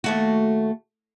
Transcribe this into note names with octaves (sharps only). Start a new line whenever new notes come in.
D#2 A3 F#4